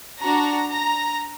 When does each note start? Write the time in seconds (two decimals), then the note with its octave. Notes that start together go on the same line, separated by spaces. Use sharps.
0.21 D4 F#4 A#5
0.70 A#5